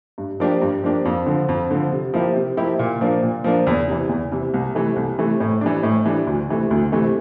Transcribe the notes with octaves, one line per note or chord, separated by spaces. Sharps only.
G2
F3 A#3 D4 G4
G2
F3 A#3 D4 G4
F2
D3 F3
F2
D3 F3
C3
F3 A#3 E4 G4
C3
F3 A#3 E4 G4
A#2
F3 A#3 D4
A#2
F3 A#3 D4
E2
C3 E3
E2
C3 E3
C2
C3 E3 A3
C2
C3 E3 A3
A2
E3 G3 D4
A2
E3 G3 D4
D2
C3 E3 A3
D2
C3 E3 A3